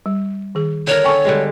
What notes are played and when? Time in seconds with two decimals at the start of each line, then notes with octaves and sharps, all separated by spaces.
0.06 G3
0.55 D#3 G#4
0.87 D3 A#4 C#5
1.04 B3 A4 G5 G#5 C#6
1.25 D3 G3 G#3